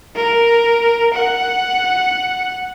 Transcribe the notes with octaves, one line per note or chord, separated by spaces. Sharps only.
A#4
F#5